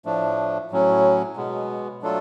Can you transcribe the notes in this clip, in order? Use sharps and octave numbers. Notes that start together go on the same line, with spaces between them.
A2 F3 A3 D4
A2 F#3 C#4
B2 G#3 B3
F#3 A3 D4 F4 A4